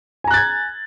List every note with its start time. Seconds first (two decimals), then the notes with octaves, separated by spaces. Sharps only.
0.24 G#5
0.27 A#5
0.31 F#6
0.34 A6
0.37 G#6